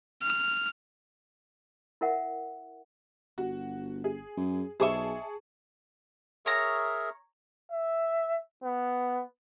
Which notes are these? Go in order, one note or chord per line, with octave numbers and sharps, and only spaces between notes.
F6
E4 A#4 E5 F#5
G1 F#4
G#4
F#2
B1 G#4 C5 D#5 E5 A5 C#6
G#4 A#4 C#5 E5 A#5
E5
B3